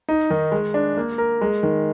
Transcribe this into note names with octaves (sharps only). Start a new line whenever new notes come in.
D#4
D#3
G#3
D4
A#3
A#4
G#3
D#3